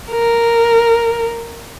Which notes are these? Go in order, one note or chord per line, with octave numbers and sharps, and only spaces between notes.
A#4